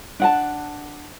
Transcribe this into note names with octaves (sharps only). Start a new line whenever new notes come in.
D4 F#5 A5